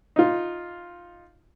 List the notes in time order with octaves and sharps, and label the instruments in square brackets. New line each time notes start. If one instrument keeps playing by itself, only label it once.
[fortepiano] D#4 F4